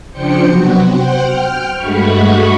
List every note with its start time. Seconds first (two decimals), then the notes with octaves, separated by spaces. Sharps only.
0.12 C#3 F3 D4 C5 G5 C#7
0.46 C3 F#3 B3 F#4
0.88 C5 F#5 G5
1.22 G5 F6
1.76 G2 G#3 A3 F#4 B5 C#6